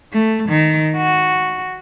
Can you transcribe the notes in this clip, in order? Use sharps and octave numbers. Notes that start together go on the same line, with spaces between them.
A3
D#3
F#4